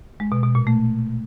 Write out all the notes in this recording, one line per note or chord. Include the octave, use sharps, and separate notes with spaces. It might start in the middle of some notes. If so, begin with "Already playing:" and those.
G#3
B2
B2
A#2
A3